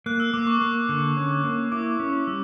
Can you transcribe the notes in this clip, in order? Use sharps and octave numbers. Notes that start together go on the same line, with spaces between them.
A#3 F#6
E6
A#3 D6
C#6
A#3
D3
C#4
A#3
E4 D6
C#4
G3 E6